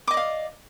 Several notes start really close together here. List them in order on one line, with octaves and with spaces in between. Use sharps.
D6 D#5 D5 F5